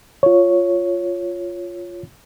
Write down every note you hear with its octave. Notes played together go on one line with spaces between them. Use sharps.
F4 C#5